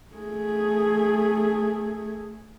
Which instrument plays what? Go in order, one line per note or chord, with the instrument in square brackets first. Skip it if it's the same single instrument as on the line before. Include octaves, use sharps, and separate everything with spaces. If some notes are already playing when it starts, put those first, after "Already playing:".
[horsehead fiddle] A3 G#4